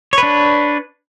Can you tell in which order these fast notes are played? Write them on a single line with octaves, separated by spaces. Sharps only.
C#5 B4 D4